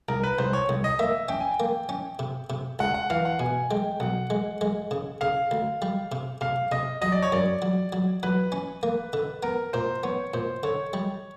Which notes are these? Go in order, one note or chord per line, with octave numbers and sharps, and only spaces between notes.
C2 A#4
B4
C2 C5
C#5
C2
D#5
A#3 E5
C#4 G5
G#5
G5
A#3
C#4
C3
C3
C#2 F#5
F#5
E3 F5
F#5
B2 G#5
G#3 G5
B1 F#5
G#3
G#3
C#3
C#3 F5
D2
G3
C3
C3 F5
C3 D#5
F#3 D#5
D5
C#5
F#2 D5
F#3
F#3
F#3 B4
C#4
A#3
D3
B3 A#4
A#2 C5
B3 C#5
A#2 C5
D3 C#5
G3